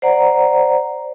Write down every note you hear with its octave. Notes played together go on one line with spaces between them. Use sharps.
C5 D5 F#5 A#5